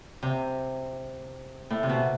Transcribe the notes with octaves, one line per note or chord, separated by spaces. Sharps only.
C3
A2
C3
B2